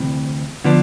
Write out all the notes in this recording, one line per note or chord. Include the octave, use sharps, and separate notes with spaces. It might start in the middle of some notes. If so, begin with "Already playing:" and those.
Already playing: D2 C3 E3
D3 F3 B3 D4